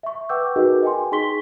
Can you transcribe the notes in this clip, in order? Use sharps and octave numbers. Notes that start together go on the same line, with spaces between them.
E5 C#6
B4 F#5 G5 D6 E6 G6
D#4 F#4 G#4 A#4 B4 D#5
D#5 G5 G#5 C6
D#4 G#4 C6 C#6 B6 G7